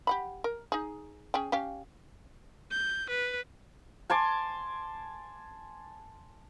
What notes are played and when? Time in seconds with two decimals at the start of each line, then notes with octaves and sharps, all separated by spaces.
0.07 G4 F#5 B5
0.44 A#4
0.72 D#4 G#4
1.34 C#4 G#4 G5
1.52 C#4 G4 F5
2.71 G6
3.10 B4
4.10 G#5 A5 C6 D6